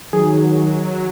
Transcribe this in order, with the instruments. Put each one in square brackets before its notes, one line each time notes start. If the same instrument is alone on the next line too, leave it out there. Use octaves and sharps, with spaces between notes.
[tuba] D#3 [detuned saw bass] F#3 [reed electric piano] G#4